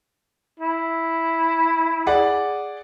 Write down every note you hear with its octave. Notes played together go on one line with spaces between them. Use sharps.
E4
G#4 D5 F#5